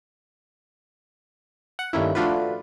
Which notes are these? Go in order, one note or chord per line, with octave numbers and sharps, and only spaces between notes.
F#5
G2 D#3 A3 A#3 C#4 E4
F3 A3 D4 F4 F#4 B4